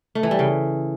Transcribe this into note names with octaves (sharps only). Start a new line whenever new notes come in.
A3
E3
G3
C#3